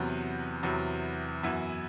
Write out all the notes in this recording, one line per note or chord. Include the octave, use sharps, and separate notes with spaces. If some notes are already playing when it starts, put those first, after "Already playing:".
Already playing: E2 C3 F#3 B3
E2 C3 F#3 B3
F#2 E3 B3 E4